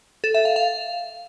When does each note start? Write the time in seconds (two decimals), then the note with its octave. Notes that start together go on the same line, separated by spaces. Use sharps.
0.24 A4
0.34 E5
0.45 F5
0.56 F5